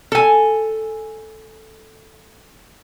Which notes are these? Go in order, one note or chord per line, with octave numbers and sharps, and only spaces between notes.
A4 G#5